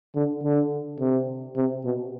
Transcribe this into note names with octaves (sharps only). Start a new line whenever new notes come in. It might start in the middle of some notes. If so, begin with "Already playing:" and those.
D3
D3
C3
C3
B2